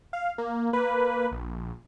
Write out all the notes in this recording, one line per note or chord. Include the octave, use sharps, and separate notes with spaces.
F5
A#3
A#3 B4
A#1